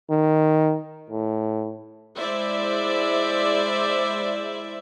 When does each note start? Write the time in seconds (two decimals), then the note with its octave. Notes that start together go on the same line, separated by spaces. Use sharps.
0.10 D#3
1.10 A2
2.15 G#3 E4 C5 D5 E5